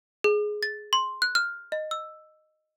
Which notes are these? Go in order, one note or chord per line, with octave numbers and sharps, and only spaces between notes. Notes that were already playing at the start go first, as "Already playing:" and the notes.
G#4
A6
C6
F#6
F6
D#5
E6